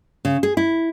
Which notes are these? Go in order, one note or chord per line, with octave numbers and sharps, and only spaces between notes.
C#3
G#4
E4